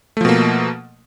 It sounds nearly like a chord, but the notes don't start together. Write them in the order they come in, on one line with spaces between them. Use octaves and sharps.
A3 F3 B2 A#3